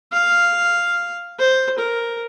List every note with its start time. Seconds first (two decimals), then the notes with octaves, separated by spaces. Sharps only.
0.12 F5
1.39 C5
1.78 A#4